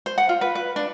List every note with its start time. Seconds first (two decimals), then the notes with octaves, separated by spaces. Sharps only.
0.06 C5
0.18 F#5
0.29 F4
0.41 B4
0.55 B4
0.76 D4